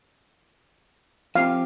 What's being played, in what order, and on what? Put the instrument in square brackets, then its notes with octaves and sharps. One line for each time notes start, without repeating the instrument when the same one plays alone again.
[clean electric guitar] F3 C4 G4 [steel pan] F5